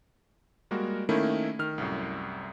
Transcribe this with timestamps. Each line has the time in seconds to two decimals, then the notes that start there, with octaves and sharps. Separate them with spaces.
0.71 G3 G#3 A#3 F#4 A#4
1.09 D#3 A3 A#3 C#4 E4
1.59 D#3 F6
1.78 C2 F#2 A2